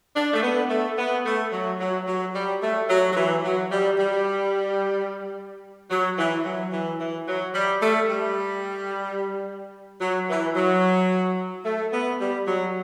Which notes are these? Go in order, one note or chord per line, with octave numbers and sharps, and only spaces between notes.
D4
A3
B3
A3
B3
A3
F#3
F#3
F#3
G3
A3
F#3
F#3
E3
F#3
G3
G3
F#3
E3
F#3
E3
E3
F#3
G3
A3
G3
F#3
E3
F#3
A3
B3
G3
F#3